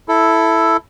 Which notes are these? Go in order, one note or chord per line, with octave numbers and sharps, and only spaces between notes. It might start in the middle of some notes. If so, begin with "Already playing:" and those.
E4 A4